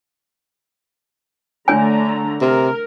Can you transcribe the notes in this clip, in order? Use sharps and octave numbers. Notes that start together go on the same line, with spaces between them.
D3 A3 D4 C#5 G#5 A#5
C3 A#4